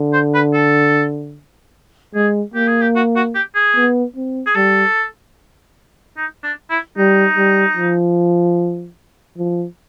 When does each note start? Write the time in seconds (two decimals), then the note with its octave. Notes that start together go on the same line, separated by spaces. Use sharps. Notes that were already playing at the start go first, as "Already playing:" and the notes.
Already playing: D3
0.13 C5
0.34 B4
0.54 A4
2.15 G#3 G#4
2.54 A#3 G4
2.67 G#4
2.81 G4
2.95 F#4
3.16 F#4
3.35 G4
3.55 G#4
3.76 B3
4.16 C4
4.46 G#4
4.55 G3 A4
6.17 D#4
6.43 D4
6.70 E4
6.98 G3 D#4
7.37 G3
7.77 F3
9.38 F3